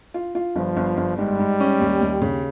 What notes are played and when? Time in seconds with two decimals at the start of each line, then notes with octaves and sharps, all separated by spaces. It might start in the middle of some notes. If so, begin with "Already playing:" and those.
0.14 F4
0.35 F4
0.56 G1 F3
0.77 G1
0.97 G1
1.18 G#2 G3
1.39 G#2
1.60 C#4
1.80 D#2
2.01 D#2
2.22 C#3